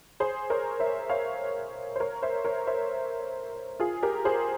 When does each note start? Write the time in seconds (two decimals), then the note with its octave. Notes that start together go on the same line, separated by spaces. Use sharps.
0.20 G#4 C5
0.50 A#4 C#5
0.80 C5 E5
1.10 C#5 F5
1.96 C5
2.00 A#4 C#5
2.22 C5 E5
2.45 A#4 C#5
2.67 C5 E5
3.80 F4 G#4
4.03 G4 A#4
4.25 G#4 C5